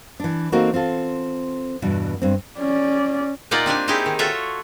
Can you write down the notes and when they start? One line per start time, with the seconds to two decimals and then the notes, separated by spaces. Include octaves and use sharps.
0.20 E3 D4
0.52 A#3 C4 D#4 F#4 A4 A#4
0.74 C4 F4 A4
1.82 E2 G2 B2
2.22 G2 C4
2.59 C#4 D5
3.51 A#2 A#3 D#4 F4 D5 F#5
3.66 C4 D4 G4 G#5
3.88 C4 D#4 E4 G4 G#4
4.06 D#3
4.19 F4 F#4 A4 C#5 E5